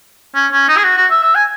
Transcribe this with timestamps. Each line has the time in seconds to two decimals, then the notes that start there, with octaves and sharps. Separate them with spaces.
0.35 C#4
0.52 C#4
0.68 D#4
0.77 G#4
0.84 F#4
0.97 F#4
1.11 E5
1.23 E5
1.35 G#5